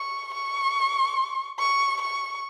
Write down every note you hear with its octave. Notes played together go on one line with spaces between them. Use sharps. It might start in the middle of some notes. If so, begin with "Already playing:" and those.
Already playing: C#6
C#6
C#6
C#6